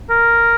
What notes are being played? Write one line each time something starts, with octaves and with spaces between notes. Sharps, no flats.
A#4